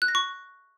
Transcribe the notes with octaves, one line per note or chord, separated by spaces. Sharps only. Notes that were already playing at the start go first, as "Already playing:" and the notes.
F#6
A#6
C#6